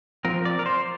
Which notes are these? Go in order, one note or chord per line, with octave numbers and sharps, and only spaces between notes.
F3 C4 A#4
D5
A#4
C5